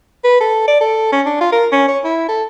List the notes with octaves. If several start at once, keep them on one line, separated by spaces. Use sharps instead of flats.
B4
A4
D5
A4
C#4
D4
F4
A#4
C#4
C#5
E4
A4